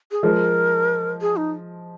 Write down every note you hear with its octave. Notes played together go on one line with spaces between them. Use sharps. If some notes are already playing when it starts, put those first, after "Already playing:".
G#4
F3 G#3 A#4
G#4
D#4